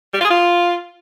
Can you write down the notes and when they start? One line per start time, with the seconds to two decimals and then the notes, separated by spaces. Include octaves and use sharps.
0.14 G3
0.19 F4
0.25 G#4
0.30 F4